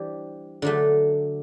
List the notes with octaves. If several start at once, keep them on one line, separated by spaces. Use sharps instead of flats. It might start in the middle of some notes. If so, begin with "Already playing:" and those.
Already playing: E3 G3 D4 G4 C5
D3 F#3 A3